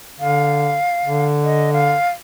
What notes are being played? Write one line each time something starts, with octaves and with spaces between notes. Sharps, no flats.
D3 F5
D3
D#5
F5